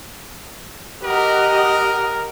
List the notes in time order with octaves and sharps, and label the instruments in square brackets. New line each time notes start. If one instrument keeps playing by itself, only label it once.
[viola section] G4 D#5 F#5 [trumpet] A#4